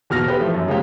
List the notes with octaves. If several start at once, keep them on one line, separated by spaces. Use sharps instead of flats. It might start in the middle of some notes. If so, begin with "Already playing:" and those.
E2 B2 F6 A#6
B3 G4 A4 B4
E3 F3 A3
F#2
C#3 F3 G#3 A#3 G4